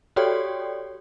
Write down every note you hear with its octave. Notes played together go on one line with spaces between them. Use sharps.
F#4 G4 A4 C#5 D5 G5